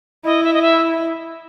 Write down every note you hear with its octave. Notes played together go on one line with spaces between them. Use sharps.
E4 D#5
E5
D#5
E5